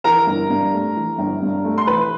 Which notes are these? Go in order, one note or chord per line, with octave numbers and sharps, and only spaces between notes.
E3 A#4 A#5
G1
G2
A3
E3
G1
G2
A3
C6
E3 B4 B5